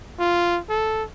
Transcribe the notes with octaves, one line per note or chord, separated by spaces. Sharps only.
F4
A4